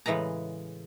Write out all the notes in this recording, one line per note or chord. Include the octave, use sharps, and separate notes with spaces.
A2 C#3 E3 G#3 B4 A#5